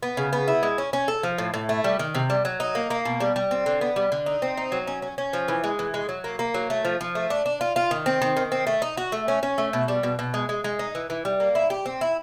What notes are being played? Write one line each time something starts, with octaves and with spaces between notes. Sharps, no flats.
B3
C#3
B3
E4
G#3
C#4
C#4
A4
F3
A2
A2
A3
G3
D#3
C3
G3
F#3
D#4
A#3
A#3
B2
G3
G3
C4
D3
B3
G3
D3
D#4
C4
D#4
F#3
C#4
C#4
C#4
F3
E3
G#3
E3
G#3
F#3
A#3
A#3
F#3
A3
F3
F3
A3
D4
D4
F4
F4
D#3
C4
D#3
D#3
C4
A3
D#4
F#4
A3
C#4
C#4
A3
B2
G3
B2
B2
G#3
G#3
G#3
D#4
E3
E3
G3
A#3
E4
G4
C4
E4